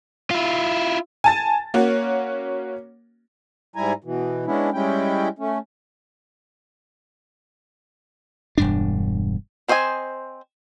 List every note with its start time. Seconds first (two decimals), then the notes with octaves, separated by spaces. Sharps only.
0.31 E4 F4
1.24 G#5 A5 A6
1.74 A#3 C#4 F#4
3.76 G#2 G3 E4 G#5 A#5
4.04 B2 E3
4.46 G#3 B3 C#4 D4 E4
4.74 G3 G#3 C#4 E4 G5
5.39 A3 C#4
8.58 E1 G2 D4
9.68 C4 C5 D#5 E5 G#5